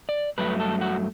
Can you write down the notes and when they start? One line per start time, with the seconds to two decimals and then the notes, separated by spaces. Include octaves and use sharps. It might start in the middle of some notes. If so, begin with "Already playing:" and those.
0.09 D5
0.38 G2 F#3 A3 B4
0.60 A4
0.81 F#4